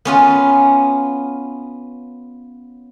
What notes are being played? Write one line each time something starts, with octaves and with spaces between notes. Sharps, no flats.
B3 C#4 F4